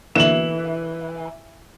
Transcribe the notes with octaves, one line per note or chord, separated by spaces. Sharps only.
B2 D3 E3 A#3 E7 F#7